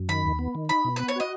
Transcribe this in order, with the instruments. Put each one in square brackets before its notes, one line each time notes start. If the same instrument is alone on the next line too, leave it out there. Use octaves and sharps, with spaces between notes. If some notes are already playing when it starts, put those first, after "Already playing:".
Already playing: [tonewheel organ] F#2
[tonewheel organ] D#3 [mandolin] B5
[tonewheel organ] D#2
B3
D#3
[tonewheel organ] D#4 [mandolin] B5
[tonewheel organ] B2
[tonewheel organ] B3 [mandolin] B4
[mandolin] C#5
[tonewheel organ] F#4 [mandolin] D#5